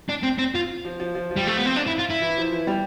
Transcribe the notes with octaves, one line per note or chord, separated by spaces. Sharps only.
D4
C4
C4
F4
F3
F3
F3
F3
G3
A3
B3
C4
D4
E4
F4
E4
E3
F3
E3
G3